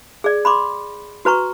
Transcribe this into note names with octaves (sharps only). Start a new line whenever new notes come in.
G#4 D5
B5 C6 D6
F#4 B4 A#5 C#6